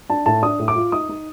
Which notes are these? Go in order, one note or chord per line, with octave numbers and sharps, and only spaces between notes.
D4 A5
A2 A5
D4 D#6
A2
D6
F4
D#4 D#6
D#4